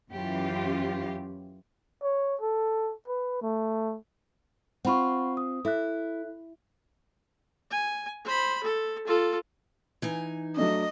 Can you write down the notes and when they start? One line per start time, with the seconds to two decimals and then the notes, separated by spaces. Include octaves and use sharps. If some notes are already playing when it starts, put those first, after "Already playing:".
0.10 F#2 E3 C#4 F4 G4
2.03 C#5
2.41 A4
3.08 B4
3.42 A3
4.85 C4 F4 F#5 B5 C#6
5.37 D#6
5.65 E4 A4 E5 F#6
7.71 G#5
8.24 C5 B5
8.63 A4
9.06 F4 A4
10.02 E3 D#4 G#5
10.57 F#3 A3 D4 D#5